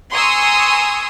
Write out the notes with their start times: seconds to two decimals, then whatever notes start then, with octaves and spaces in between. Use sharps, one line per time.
0.13 G#5 A#5 C6 C#6 D#6 E6